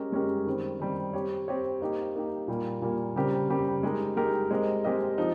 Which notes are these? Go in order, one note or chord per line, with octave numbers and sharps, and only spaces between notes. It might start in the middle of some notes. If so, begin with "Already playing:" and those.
Already playing: G#3 C#4 G4 A#4
G#3 C#4 G4 A#4
D#3 G3 C4
D#3 G3 C4
C4 G4 C#5
C4 G4 C#5
A#3 D#4 G4
A#3 D#4 G4
A#2 G3 A#3
A#2 G3 A#3
C#3 G3 C4 G4 A#4
C#3 G3 C4 G4 A#4
G#3 D#4 G4 A#4
G#3 D#4 G4 A#4
G#3 C4 G4 A#4 D#5
G#3 C4 G4 A#4 D#5
F3 C4 D#4